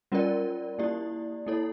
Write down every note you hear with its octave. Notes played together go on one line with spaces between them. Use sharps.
G3 C#4 F4 A#4 D5
A#3 E4 G4 D5
A#3 E4 A4 C#5